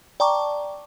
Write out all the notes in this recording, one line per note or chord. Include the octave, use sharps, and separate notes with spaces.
D5 G5 A5 A#5 C#6 D6